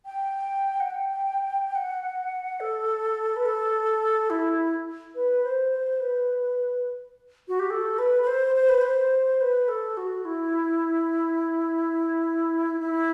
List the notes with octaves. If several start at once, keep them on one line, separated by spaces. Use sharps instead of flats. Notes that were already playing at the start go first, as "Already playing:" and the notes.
G5
F#5
G5
F#5
A4
B4
A4
E4
B4
C5
C5
B4
F#4
G4
A4
B4
B4
C5
C5
B4
C5
B4
A4
F#4
E4
E4